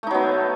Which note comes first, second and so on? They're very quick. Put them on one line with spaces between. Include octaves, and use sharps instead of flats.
A3 D#4 F#3 B3